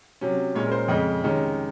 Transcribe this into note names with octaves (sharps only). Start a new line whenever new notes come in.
C3 F#3 C#4
A#2 G#3 C#4 C#5
A#4
C5
F2 C#3 G#3 D#5
C3 D#3 G#3 C#4